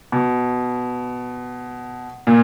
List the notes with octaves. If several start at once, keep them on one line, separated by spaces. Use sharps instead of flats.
B2
A#2